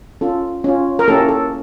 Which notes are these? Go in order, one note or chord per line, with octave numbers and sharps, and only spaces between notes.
C#4 F4 A4
C#4 F4
A#4
A#3 C#4 E4 G4 A4
A4